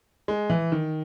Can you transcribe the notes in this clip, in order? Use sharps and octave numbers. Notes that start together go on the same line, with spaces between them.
G#3
E3
D#3